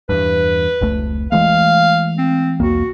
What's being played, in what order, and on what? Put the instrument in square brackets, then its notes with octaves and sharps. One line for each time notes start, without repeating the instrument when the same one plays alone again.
[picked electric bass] E2 G2 [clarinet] B4
[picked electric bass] F1 C#2 A3
[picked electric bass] E3 G#3 A3 [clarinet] F5
[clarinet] C4
[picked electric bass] B1 E2 A#3 [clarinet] F#4